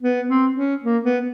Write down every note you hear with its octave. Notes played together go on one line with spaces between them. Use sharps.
B3
C4
C#4
A#3
B3